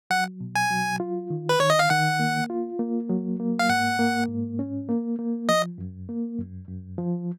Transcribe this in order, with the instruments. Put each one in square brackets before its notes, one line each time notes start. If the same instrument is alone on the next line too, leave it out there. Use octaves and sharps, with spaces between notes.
[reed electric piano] F#3 [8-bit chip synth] F#5
[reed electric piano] B2
[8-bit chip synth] G#5
[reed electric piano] F#3
F4
D#3
[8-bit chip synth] B4
[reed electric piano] D#3 [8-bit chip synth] C#5
[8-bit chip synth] D#5
F5
[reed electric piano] D#3 [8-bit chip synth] F#5
[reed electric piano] A#3
F4
A#3
F#3
A#3
[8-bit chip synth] F5
[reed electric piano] G#2 [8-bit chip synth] F#5
[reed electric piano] A#3
G#2
C#4
A#3
A#3
[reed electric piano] F3 [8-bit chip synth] D#5
[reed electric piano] F#2
A#3
F#2
F#2
F3